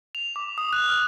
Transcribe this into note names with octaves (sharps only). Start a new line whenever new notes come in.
F7
D6
D#6
F#6
F6